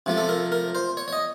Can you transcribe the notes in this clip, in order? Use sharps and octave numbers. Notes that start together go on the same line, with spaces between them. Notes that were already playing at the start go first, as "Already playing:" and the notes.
C3 F3 A3
A4
A#4
A#4
C5
C#5
C#5
D#5